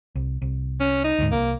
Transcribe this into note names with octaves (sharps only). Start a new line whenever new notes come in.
C2
C2
C#4
D#4
D2 G#2
C2 A#3